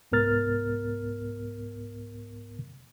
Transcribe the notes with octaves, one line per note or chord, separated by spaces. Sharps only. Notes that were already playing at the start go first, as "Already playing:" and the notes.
C2 G#2 B3 A#4 F6 A6